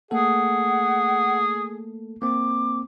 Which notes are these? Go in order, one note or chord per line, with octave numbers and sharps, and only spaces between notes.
A3 A#3 G#4 A4 F#5
A#3 C4 D6